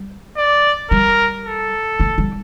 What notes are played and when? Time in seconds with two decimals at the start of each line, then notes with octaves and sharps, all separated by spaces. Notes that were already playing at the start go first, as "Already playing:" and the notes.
Already playing: G3
0.37 D5
0.91 G3 A#4
1.46 A4
2.00 A3
2.18 G3